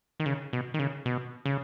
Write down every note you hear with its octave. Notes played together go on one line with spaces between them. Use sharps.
D#3
C#3
B2
D#3
C#3
B2
C#3